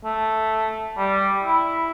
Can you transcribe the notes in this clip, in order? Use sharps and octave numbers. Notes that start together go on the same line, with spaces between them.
A3
G3
E4